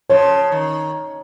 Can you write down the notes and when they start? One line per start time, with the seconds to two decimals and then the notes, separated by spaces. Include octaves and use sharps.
0.09 C#3 F3 C#5
0.52 D#3